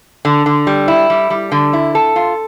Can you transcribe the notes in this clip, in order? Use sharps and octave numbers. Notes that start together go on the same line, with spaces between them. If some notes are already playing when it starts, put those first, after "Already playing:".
D3
D3
G3
E4
G3
G3
D3
E4
A4
F4